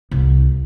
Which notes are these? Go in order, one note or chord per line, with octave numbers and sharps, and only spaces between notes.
C2